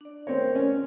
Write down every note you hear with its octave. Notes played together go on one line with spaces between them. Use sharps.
D4 D5
C4 A#4 C#5
C#4